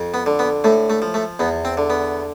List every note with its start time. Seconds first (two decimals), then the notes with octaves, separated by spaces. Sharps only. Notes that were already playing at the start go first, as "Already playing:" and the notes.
Already playing: F2
0.14 B3
0.26 D3
0.39 B3
0.64 A2 A3
0.90 A3
1.02 F3
1.14 A3
1.39 E2 B3
1.65 C4
1.77 D3
1.90 B3